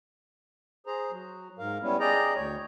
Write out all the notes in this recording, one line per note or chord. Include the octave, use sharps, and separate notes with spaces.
G#4 C5 A#5
F#3
G#2 A#4 F5
G3 B3 C#4 E4
G#4 D5 D#5 G5 A#5
D2 C#5